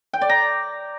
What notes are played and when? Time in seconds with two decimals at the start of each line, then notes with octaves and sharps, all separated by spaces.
0.13 G5
0.21 D5
0.29 A#5